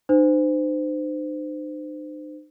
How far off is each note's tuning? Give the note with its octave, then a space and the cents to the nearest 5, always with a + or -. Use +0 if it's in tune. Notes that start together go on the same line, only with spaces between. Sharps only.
D#4 -45 C5 -30